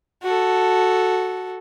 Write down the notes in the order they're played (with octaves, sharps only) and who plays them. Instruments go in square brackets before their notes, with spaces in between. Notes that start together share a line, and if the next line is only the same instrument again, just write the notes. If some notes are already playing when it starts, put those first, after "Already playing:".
[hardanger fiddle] F#4 A4